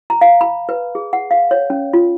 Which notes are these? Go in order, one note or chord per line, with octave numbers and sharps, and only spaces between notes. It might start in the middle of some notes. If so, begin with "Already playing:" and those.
A#5
F5
B5
B4
G#4
F#5
F5
C#5
C#4
F4